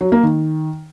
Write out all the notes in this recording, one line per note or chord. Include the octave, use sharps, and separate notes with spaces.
F#3
A#3
D#3